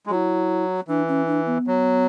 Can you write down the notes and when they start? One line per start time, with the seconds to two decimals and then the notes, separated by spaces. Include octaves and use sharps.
0.06 G#3
0.10 F#3 E4 F#4
0.88 E3 D4
1.08 C#4
1.27 D4
1.46 B3
1.67 F#3